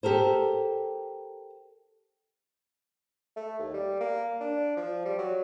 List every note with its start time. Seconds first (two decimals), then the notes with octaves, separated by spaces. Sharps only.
0.03 G4 A4 A#4 C5
3.36 A3
3.59 D#2
3.74 G3
4.00 A#3
4.40 D4
4.77 F3
5.05 G3
5.18 F#3